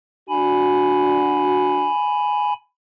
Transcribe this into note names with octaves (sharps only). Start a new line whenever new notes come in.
D4 F#4 G#5 B5